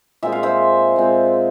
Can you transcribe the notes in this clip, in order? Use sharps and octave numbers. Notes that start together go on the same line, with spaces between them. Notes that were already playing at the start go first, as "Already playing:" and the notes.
A#2 G#3 C4 E5
F5
C5 E5
A#2 G#3 C4